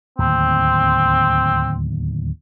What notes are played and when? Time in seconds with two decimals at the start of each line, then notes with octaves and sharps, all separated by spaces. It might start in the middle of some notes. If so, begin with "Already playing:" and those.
0.19 D1 D#2 C4